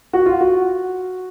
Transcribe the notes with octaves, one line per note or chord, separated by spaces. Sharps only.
F#4
F4
F#4